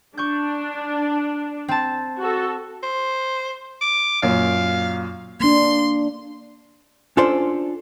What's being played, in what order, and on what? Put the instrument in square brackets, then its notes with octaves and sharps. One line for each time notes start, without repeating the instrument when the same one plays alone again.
[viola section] D4 [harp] C#6 G6
[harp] C4 A5
[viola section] F#4 A4
[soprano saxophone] C5
D6
[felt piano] F#2 A#2 [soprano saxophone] F5
[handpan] A#3 D4 [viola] C6
[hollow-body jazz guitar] C#4 D4 F4 A4 C5 D5